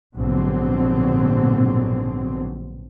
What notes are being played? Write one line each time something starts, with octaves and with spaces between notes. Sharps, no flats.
A#1 G#2 B2 D3 F#3 C4